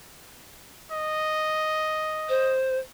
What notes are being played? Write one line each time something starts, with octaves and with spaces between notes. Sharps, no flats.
D#5
C5